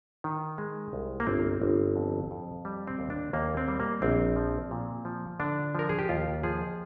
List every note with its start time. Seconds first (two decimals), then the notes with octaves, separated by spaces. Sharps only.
0.24 D#3
0.58 G#3
0.93 C2
1.20 A#3
1.27 G1 C4
1.62 G1
1.96 F2
2.31 F2
2.65 G3
2.87 C4
2.99 D#2
3.10 D4
3.33 D#2 A#3
3.57 C4
3.68 G3
3.80 A#3
4.02 A#1 C4
4.36 F3
4.71 A#2
5.05 F3
5.40 D3 D4
5.75 F3 A#4
5.89 G#4
5.99 G4
6.09 D#2 F4
6.43 F3 G#4